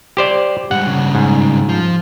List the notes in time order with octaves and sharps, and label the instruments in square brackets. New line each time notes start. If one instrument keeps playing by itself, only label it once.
[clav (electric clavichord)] G4 C5 D5
[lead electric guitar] G#2 G3 [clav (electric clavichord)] F#5
[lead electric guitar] G2 C#3
[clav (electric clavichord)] G#2
[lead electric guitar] F3